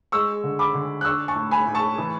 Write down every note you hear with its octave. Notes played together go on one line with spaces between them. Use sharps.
G#3 C#6 E6
D3
B5 D6
D3
F#6
D4 C#6 E6
A5 C#6
A2
G#5 B5
A2
A5 C#6
E3